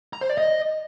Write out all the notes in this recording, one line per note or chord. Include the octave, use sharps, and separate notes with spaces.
A#5
C5
D5
D#5